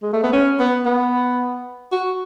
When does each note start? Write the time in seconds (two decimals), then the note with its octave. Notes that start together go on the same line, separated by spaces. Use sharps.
0.03 G#3
0.13 A3
0.23 B3
0.33 C#4
0.59 B3
0.85 B3
1.92 F#4